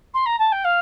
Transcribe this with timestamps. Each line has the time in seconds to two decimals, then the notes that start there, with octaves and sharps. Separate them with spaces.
0.14 C6
0.26 A#5
0.39 A5
0.52 G5
0.64 F5